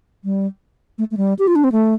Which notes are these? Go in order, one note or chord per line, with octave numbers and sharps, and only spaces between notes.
G3
A3
A3
G3
G4
F4
D4
C4
A3